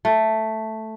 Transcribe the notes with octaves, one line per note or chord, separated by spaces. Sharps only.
A3